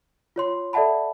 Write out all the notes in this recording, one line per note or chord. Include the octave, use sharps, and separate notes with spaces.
F4 C#5 C6
A4 D5 E5 F#5 A5 B5